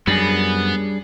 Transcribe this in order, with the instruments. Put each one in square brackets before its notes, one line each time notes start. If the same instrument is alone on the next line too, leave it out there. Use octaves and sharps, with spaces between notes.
[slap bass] F#2 [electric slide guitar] G3 D4 G#4 [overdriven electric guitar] B3